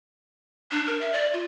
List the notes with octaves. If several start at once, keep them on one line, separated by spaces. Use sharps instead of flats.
D4
A#4
E5
D5
F4